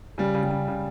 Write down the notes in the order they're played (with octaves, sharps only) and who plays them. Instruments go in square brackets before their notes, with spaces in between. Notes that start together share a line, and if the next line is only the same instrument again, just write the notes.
[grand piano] C#3 G3
C#3
G3
C#3
C#3